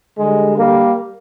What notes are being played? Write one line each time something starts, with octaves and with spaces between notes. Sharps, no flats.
D3 G3 G#3
G3 A#3